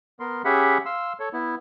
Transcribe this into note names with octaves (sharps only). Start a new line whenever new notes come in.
B3 A#4 C6
C#4 G4 G#4 E5 F#5 B5
F5 C6 E6
A4 C#5
B3 E4